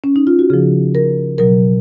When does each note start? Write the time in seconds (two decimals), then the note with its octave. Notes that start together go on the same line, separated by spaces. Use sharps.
0.04 C#4
0.16 D#4
0.27 F4
0.39 F#4
0.50 C#3 F3 G#4
0.95 A#4
1.38 B2 F#3 A#4